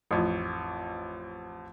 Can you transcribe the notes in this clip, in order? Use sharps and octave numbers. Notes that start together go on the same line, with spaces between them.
A1 F2